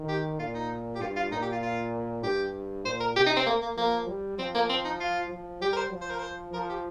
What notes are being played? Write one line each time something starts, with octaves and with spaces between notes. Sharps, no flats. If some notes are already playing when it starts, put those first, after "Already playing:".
Already playing: D#3
G4
A#2 F4
D#4
G4
G2 F4
F4
A#2 D#4
G4
F4
F4
G2 G4
A#2 C5
A#4
C3 G4
D#4
C4
A#3
A#3
F3 A#3
G3
F3 C4
A#3
C4
D#4
F4
F3
G3 G4
A#4
C5
F3
C5
A#4
C5
F3 A#4
G4